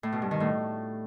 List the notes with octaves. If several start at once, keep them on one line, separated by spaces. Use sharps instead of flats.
A2
B2
G2
D#3
A2